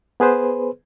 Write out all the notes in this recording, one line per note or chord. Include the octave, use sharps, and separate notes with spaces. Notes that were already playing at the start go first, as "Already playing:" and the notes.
B3 G#4 B4 C5